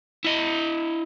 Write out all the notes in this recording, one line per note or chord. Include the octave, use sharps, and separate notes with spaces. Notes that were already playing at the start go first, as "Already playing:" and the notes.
E4 D#5